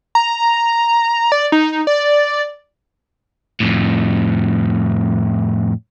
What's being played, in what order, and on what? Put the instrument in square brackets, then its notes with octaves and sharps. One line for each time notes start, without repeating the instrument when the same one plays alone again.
[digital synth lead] A#5
D5
D#4
D5
[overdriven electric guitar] F2 A2